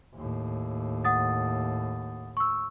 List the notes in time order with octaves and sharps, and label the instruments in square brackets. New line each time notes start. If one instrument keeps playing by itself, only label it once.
[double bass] D#2 A2
[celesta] F#5 D#6 A6
C#6 E6